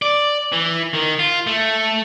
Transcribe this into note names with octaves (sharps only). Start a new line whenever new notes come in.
D5
E3
D#3
F4
A3